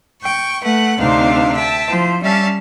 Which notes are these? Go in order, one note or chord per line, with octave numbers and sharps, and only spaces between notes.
G5 C#6
A3 B4 F#5
D2 C3 C4 D4 D#4 F5
E5 G5 A5
F3 E4 C5
G3 C#4 E5 F5 A5